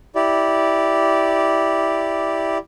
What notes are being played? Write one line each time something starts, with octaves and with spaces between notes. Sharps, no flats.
E4 G4 D5